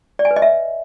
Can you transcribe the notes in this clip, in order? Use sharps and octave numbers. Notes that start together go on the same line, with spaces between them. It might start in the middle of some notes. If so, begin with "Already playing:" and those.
D5
G#5
B4
D#5
E5